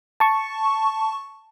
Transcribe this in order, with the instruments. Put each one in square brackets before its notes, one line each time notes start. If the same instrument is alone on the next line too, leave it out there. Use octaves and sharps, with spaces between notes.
[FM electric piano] A5 C#6